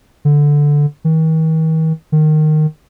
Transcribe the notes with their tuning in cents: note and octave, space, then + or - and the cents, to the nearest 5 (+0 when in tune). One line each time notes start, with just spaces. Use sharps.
D3 -5
D#3 +45
D#3 -15